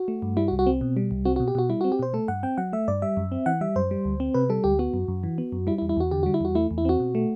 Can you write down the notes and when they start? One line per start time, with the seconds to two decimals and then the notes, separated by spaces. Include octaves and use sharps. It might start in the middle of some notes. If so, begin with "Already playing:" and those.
Already playing: F#4
0.08 A3
0.22 G2
0.37 G3 E4
0.48 F#4
0.52 C2
0.59 F#4
0.66 C4
0.81 B2
0.97 G3
1.11 C2
1.25 C4 F#4
1.36 B2 F#4
1.48 G4
1.55 B2 F#4
1.70 G3 E4
1.81 C4 F#4
1.92 G4
1.99 B2 C5
2.14 A3 A4
2.28 G2 F#5
2.43 C4 G5
2.58 F#3 F#5
2.73 A3 E5
2.88 G2 D5
3.02 G3 E5
3.17 F#2
3.32 C4
3.46 E3 F#5
3.61 G3 E5
3.76 F#2 C5
3.91 G3
4.05 D2
4.20 C4
4.34 C3 B4
4.50 G3 A4
4.64 D2 G4
4.79 B3 F#4
4.94 F#2
5.08 F#2
5.23 E3
5.38 B3
5.52 F#2
5.67 G3 E4
5.78 E4
5.82 E2
5.89 E4
5.97 E2 F#4
6.11 D3 G4
6.23 G3 F#4
6.34 E4
6.41 E2 F#4
6.55 A3 E4
6.71 E2
6.78 E4
6.85 C4 F#4
7.00 B2
7.15 A3